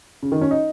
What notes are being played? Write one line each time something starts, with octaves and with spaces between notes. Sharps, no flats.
C#3
D#3
C#4
D#4